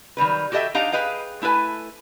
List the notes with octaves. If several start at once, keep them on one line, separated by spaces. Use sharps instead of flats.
D#3 F#3 G3 B4
F#4 G4 A4 D#5 E5 G5
D4 D#4 G4 D#5 F5 A#5
G#4 B4 D#5 F5 G5
A3 E4 A4 B4 G#5